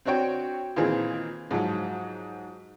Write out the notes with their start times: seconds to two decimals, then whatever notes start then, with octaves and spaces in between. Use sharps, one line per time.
0.05 C4 D4 F#4 C#5 G5
0.76 A#2 D#3 E3 C4 G#4
1.51 G#2 F3 F#3